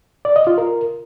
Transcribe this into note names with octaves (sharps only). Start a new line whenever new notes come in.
D5
D#5
F4
A#4